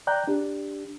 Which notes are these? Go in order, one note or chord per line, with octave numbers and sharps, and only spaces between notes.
D5 G5 A#5 F#6 G6
D4 G4